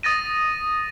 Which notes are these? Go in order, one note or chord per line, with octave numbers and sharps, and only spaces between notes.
D#6 A6 A#6 D#7